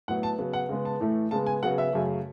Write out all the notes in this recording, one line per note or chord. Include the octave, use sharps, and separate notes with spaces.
A2 F#3 B3 F#5
A5
C#3 F#3 B3
F#5
C#3 G#3 B3
A5
A2 E3 A3
C#3 G#3 B3 A5
G#5
C#3 F#3 B3 F#5
E5
F#2 C#3 F#3 A3